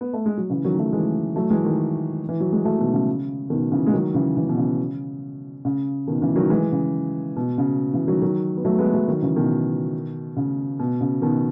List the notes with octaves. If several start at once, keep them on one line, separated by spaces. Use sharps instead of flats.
B3
A3
G#3
F#3
C#3 E3
D#3 F#3
F#3 A3
E3 G#3
F#3 A3
E3 G#3
D#3 F#3
E3
F#3
G#3
F#3 A3
B2 D#3
C#3
B2 D#3
C#3 E3
G#3
D#3 F#3
C#3 E3
C#3 E3
B2
C#3
C#3
B2 D#3
C#3 E3
D#3 F#3
E3 G#3
C#3
B2
C#3
C#3 E3
D#3 F#3
D#3 F#3
B3
F#3 A3
G#3 B3
F#3 A3
D#3 F#3
C#3 E3
B2 D#3
C#3
B2
C#3
B2 D#3